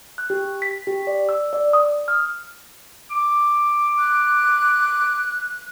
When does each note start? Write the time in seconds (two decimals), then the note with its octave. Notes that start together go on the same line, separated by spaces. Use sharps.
0.18 F#6
0.30 G4
0.62 B6
0.87 G4
1.07 D5
1.29 E6
1.53 D5
1.73 D#6
2.08 F6
3.11 D6
3.98 F#6